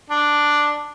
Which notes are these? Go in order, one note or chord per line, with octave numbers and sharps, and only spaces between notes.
D4